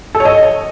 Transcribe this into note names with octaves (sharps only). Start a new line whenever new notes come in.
A4
C#5
D#5